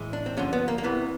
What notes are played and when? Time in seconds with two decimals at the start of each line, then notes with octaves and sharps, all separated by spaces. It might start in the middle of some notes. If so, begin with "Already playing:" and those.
Already playing: A2 E3 G#3
0.13 D4
0.26 C4
0.37 G2 D3 F3 C#4
0.53 B3
0.68 A#3
0.78 A#3
0.83 E2 C3 E3 B3